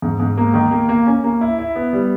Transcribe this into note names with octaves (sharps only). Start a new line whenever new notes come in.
G#2
G#2
A#3
D#3
A#3
A#3
C#4
A#3
E4
E4
B3
G3